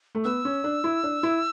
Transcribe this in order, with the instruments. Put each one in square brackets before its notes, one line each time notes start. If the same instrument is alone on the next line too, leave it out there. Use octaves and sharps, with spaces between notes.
[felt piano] A3
[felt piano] B3 [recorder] E6
[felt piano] C#4
D4
E4
D4
E4